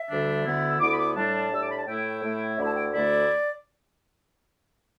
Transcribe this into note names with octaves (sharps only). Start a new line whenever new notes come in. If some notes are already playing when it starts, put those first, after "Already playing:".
Already playing: E5
D2 D3 G3 D4
D2 D3 B3 E4
E6
D2 D3 B3 E4 D6
B5
D6
A2 G3 D4 A5
A2 G3 D4 E6
D6
B5
A5
A2 A3 E4 G5
A2 A3 E4
D2 D3 A3 E4 E5 B5
A5
G5
D2 D3 A3 E4 D5